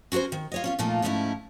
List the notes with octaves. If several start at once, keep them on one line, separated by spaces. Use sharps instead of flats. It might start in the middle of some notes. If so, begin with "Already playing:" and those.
C#4 F#4 G#4 A#4 C5
D#3
F4 C#5 D#5
C#4 F4 C#5
A#2 F3 A3 A#3 D#4 F4
G#2 F3 A3 C#4 D#4 E4